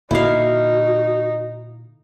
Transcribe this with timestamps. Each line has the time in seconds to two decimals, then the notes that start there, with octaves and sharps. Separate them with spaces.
0.11 A#2 D3 A#3 D#4 E4 F#4 F5